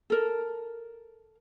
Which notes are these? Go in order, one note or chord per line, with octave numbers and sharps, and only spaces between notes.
A4 A#4